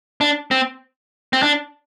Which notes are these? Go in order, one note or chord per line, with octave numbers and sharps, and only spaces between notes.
D4
C4
C4
D4